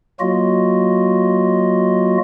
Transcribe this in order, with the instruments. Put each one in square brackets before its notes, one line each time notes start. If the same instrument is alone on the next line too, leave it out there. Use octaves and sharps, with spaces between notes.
[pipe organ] F#3 A#3 F4 F#4 D#5